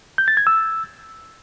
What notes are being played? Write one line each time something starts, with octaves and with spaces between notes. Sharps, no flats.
G6
A6
G#6
E6